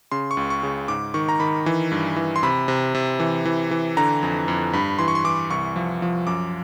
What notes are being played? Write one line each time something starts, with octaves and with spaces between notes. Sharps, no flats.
C#3 C6
C#6
C#2
C#6
C#3
G#2 D6
D#3 C#6
A#5
D#3 B5
E3
G2
E3
C6
C3 B5
C3
C3
E3
E3
E3
D3 A#5
F2
F2
G2 B5
E3 C6
C#6
C6
E3 D6
C2 C#6
F3
F3
F#2 D6